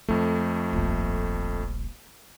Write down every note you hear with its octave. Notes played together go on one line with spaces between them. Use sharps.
F2 G#3 A3 D4
D#1 A#1